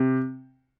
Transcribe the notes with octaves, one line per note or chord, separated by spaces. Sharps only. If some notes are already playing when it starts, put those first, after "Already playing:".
Already playing: C3